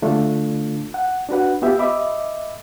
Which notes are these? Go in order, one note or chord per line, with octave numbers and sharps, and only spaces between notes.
D3 A3 D4 F4 A4
F#5
D4 F#4 B4 F#5
B3 F4 G4 E5 G5
D#5 E5 B5 D6